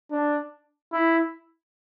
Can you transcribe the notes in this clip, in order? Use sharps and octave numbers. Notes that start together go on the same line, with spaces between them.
D4
E4